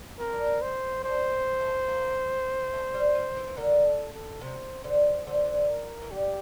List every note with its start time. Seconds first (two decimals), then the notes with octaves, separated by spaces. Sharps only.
0.19 C4 A#4
0.33 D4
0.46 C4
0.62 C5
1.04 D4 C5
1.33 C4
1.61 A3
1.88 A#3
2.74 A3
2.94 G3
3.15 F3
3.36 E3
3.48 E3
3.57 D3 A#4
3.86 A4
4.13 A4
4.41 C3 C5
4.84 D3 C5
5.27 D3 C5
5.35 E3
5.45 D3
5.69 A#4
6.02 E3
6.11 D3 G4